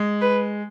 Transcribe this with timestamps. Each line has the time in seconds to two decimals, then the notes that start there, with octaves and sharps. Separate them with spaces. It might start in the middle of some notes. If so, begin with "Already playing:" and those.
Already playing: G#3
0.21 B4